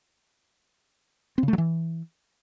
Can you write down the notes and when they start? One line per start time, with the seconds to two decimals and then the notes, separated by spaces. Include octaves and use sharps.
1.38 C4
1.43 C#3
1.48 A3
1.53 F#3
1.58 E3